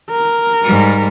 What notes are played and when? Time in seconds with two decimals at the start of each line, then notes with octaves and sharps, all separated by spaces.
0.10 A#4
0.63 G#2 G3